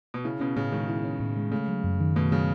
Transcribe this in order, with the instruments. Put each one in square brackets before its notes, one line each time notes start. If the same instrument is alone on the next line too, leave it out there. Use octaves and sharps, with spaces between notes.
[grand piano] B2
[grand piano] C#3 [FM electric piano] E4
[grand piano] B2 [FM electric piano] C#4
[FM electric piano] A2 [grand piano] C#3
[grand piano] D#3 [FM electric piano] G#3
[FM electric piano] E4
C#4
A2
G#3
[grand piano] C#3 [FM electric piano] A3
[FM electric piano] F#3
F#2
D#3
[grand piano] B2 [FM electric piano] A3
[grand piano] C#3 [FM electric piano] F#3